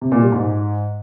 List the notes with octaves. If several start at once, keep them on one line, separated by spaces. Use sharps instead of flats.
C3
A#2
G3
G#2